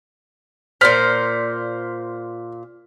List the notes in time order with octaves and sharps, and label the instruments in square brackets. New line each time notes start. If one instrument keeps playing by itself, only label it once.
[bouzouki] A#2 C#3 C5 [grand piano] F6 B6